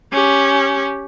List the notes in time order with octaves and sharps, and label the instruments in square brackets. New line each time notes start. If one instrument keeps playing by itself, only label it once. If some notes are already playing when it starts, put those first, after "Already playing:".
[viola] C#4 G4